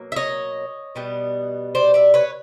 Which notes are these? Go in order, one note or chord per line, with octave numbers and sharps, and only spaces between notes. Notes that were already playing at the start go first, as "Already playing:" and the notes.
Already playing: B2 F#3 A#3
E5
C#5 D#5
B2 G3 B3
C5 D5
D5 E5
B4 C#5